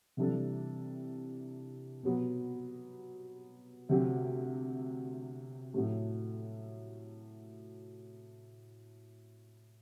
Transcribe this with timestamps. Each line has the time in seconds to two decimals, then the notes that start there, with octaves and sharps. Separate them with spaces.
0.17 C3 E3 G3 D4 A4
2.03 B2 F#3 B3
3.89 D2 C3 F#3 C4 G4
5.74 A2 F#3 A3